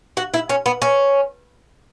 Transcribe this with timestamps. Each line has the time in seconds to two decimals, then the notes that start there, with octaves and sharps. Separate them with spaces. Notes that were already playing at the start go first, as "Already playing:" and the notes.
0.17 F#4
0.34 E4
0.49 C#4
0.66 B3
0.82 C#4